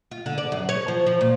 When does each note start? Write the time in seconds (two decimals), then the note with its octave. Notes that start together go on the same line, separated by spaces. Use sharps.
0.11 F4
0.26 D3
0.38 D5
0.52 F#2
0.69 C#5
0.88 F3
1.06 F3
1.21 A#2